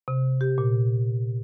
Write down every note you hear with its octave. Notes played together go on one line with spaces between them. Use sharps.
C3
G4
A#2